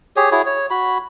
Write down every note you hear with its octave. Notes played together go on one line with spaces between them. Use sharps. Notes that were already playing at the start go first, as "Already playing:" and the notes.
G4 G#4 C#5
E4 F#4 G#4 C#5
C#5
F#4 B5